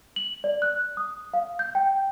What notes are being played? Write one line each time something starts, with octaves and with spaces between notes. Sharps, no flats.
F#7
D5
F#6
D#6
F5
G6
G5